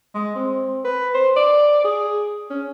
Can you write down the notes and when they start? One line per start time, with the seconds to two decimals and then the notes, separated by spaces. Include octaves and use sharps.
0.14 G#3
0.35 C4
0.84 B4
1.14 C5
1.36 D5
1.84 G#4
2.50 C#4